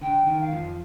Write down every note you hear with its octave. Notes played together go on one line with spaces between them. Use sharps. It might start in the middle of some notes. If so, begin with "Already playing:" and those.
D3 G5
D#3
G5
F5
F2 F3